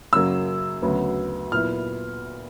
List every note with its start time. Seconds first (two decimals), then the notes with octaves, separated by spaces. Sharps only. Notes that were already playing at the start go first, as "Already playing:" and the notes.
0.13 F#2 C#3 F#3 A#3 E6
0.82 D2 C#3 F#3 B3
1.52 A#2 F#3 B3 E4 F6